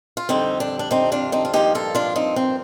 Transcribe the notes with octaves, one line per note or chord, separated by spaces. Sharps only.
F4
F2 D3 G3 C4 D#4
D4
D4
C4 D#4
D4 F4
C4 D#4
F4
G2 F3 A#3 D#4 G4
F4 A4
D4 F4
C4 D#4
C4